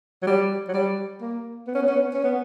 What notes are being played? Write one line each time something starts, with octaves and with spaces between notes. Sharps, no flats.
F#3
G3
F#3
G3
A#3
B3
C#4
B3
C#4
B3
C#4
B3